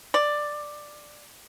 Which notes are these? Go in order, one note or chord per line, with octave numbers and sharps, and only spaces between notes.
D5